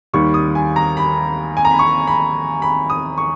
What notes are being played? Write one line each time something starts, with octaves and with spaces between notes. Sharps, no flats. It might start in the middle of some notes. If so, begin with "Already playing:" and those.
D#2 D#3 G3 C#6
D#6
G#5
A#5
B5
G#5
A#5
B5
C#6
B5
B5
D#6
C#6